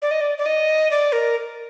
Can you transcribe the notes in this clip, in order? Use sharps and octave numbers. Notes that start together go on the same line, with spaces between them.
D5
D#5
D5
D5
D#5
D5
A#4